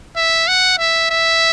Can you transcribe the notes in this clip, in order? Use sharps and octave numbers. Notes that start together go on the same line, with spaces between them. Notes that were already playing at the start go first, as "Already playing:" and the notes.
E5
F#5
E5
E5